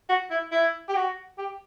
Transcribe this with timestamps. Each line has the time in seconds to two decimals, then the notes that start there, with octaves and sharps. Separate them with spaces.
0.09 F#4
0.30 E4
0.52 E4
0.89 G4
0.95 F#4
1.38 G4